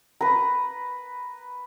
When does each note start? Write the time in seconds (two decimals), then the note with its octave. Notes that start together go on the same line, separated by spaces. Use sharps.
0.21 B4 A#5